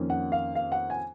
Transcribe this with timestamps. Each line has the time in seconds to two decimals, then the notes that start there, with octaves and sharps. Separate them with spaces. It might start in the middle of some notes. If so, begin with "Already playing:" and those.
Already playing: F2 D#3 A#3 C#4
0.10 F#5
0.32 F5
0.55 F5
0.72 F#5
0.90 G#5